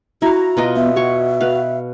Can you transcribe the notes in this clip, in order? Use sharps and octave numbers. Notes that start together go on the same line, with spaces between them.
E4 F#4 F5 A#5
B2 F4 D#5
B3 E5
F#4 C#5 C#6
B4 F5